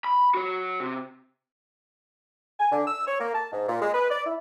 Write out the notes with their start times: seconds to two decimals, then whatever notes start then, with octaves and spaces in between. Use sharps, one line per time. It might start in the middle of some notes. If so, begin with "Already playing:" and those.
0.04 B5
0.34 F#4 C#5
0.80 C3
2.60 G#5
2.72 D3
2.87 E6
3.07 C#5
3.20 A#3
3.35 A5
3.53 G#2
3.69 A#2
3.82 G#3
3.94 B4
4.10 D5
4.26 E4